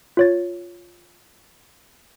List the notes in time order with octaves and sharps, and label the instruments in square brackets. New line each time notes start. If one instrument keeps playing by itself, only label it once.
[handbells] F4 C#5 A6